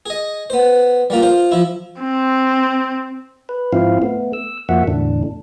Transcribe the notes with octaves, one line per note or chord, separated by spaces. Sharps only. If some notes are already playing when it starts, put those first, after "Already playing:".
G#4 D#5
B3 C5
G3 A#3 F4
F4 C5
F3 E4
C4
B4
G#2 F3 C4 E4 F4 F5
A3 B3
E6
F2 F3 A#3 F#4 E5 F#5
E2 A2 D3 D4